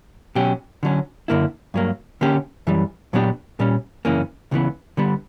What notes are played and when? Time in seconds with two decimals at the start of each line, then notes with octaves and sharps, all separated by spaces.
0.35 B2 F#3 C#4 G4
0.83 D3 F#3 C#4
1.28 F#2 D3 A#3 E4
1.74 G2 F#3 A#3
2.21 D3 A#3 C#4 G4
2.67 F#2 E3 G3
3.13 A#2 F#3 B3 D4 G4
3.59 A#2 G3 C#4
4.05 F#2 C#3 E3 A#3 C#4
4.51 C#2 C#3 E3 B3
4.97 D3 G3 B3